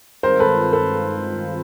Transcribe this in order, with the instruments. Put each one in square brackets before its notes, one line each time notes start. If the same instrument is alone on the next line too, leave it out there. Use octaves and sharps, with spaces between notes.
[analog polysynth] G2 D#3 G#3 C4 F4 [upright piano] A#4 C5
[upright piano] A4 B4
A4 B4